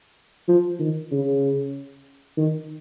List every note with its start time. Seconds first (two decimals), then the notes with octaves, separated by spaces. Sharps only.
0.48 F3
0.79 D#3
1.11 C#3
2.37 D#3